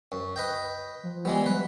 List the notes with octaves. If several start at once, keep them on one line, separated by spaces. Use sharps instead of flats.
F#2
B4 D#5 G5
F3
E3 G3 G#3 B3
F#3 B4